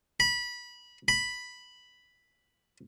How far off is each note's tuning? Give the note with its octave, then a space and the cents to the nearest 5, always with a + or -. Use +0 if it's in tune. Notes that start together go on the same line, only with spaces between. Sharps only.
B5 -20
B5 +0